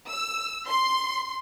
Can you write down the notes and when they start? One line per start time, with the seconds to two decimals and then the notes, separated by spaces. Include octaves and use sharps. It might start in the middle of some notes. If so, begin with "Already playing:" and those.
0.11 E6
0.68 C6